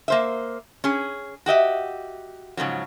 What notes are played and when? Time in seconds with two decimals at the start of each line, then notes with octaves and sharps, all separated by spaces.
0.08 A#3 C5 E5
0.84 C#4 G#4
1.46 F#4 G4 D#5 E5
2.57 G#2 C#3 F3 F#3